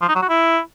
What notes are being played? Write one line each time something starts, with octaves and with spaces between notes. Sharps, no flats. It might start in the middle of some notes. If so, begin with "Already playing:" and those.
F3
D#4
F#3
F#4
E4